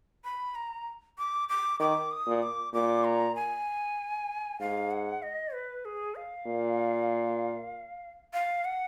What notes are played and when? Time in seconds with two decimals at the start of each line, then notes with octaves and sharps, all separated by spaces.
0.24 B5
0.55 A#5
1.18 D6
1.49 D6
1.80 D#3 D6
2.11 D#6
2.26 A#2
2.43 D6
2.73 A#2 D6
3.04 A#5
3.35 G#5
4.60 G#2 F5
4.91 F#5
5.23 D#5
5.54 B4
5.85 G#4
6.16 F5
6.47 A#2
8.33 F5
8.65 F#5